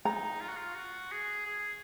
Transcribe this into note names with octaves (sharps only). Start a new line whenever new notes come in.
D#4 A#5
F4
F#4
F4
F#4
G#4
G#4